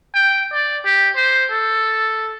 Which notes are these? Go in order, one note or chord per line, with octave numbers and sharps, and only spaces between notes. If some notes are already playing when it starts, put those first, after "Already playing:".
G5
D5
G4
C5
A4